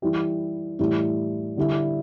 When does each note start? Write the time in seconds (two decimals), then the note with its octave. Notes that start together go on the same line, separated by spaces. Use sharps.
0.02 E3 G3 E4 G4
0.79 A2 E3 G3 E4
1.57 D3 G3 E4